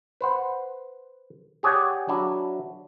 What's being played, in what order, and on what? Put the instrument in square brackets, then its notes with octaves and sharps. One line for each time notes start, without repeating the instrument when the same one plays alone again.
[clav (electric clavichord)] B4 C5 F#5
G4 G#4 C#5 D5 F#5 G#5
F#3 D4 E4